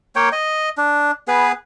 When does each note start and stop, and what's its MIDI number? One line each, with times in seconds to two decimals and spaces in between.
0.16 0.29 58
0.16 0.29 73
0.16 0.29 79
0.32 0.69 75
0.78 1.11 62
1.28 1.52 59
1.28 1.52 68
1.28 1.52 71